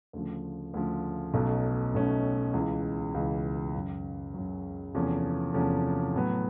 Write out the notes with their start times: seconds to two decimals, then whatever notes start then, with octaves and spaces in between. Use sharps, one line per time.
0.13 D2 C#3 F3
0.74 D2 C#3 F3
1.34 B1 B2 F#3 A3 C#4
1.94 B1 B2 F#3 A3 C#4
2.54 C#2 C#3 E3
3.14 C#2 C#3 E3
3.74 F#2 C#3 F#3
4.34 F#2 C#3 F#3
4.94 E2 C3 F3 A3 C#4
5.54 E2 C3 F3 A3 C#4
6.14 A2 F#3 B3